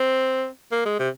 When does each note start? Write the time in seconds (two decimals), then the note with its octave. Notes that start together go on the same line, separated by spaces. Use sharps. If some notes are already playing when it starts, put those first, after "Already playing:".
Already playing: C4
0.72 A#3
0.85 G#3
0.99 C3